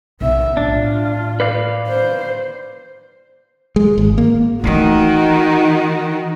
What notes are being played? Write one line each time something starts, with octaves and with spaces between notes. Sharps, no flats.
B1 B3 E5
A2 D4 F4
B4 D5 F5
C5
G#3
G#1
A#3
D#3 E3 A3 D#4 F#4